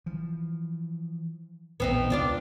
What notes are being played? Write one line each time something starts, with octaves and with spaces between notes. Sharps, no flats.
E3 F3
A#1 E2 A2 B3 C4 D#4
C#2 D4 F4 D5